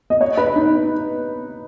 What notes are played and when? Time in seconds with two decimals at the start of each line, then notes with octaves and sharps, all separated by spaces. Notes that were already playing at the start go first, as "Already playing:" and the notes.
0.10 D#5
0.21 C#5
0.37 B4
0.56 D#4